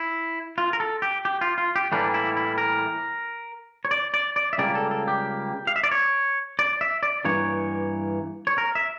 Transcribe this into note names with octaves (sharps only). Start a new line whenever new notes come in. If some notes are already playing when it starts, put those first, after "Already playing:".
Already playing: E4
F4
A#4
A4
G4
G4
F4
F4
G4
A2 E3 G3 A#3 D4
E4
E4
A#4
C#5
D5
D5
D5
E5
C#2 C#3 G3 A#3 D5
A4
A4
G4
F5
E5
D5
C#5
D5
E5
D5
G2 E3 A#3 C#5
C#5
A#4
E5